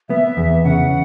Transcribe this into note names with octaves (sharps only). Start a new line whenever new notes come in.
B3 E5
E2
C#3 F#5